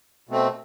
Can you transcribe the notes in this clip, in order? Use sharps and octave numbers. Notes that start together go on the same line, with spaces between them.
B2 A3 C4